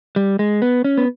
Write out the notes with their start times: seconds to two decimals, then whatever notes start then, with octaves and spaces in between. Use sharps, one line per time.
0.16 G3
0.39 G#3
0.62 B3
0.84 C#4
0.97 B3